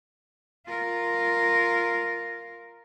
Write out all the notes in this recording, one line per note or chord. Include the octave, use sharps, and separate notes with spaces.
F4 A#4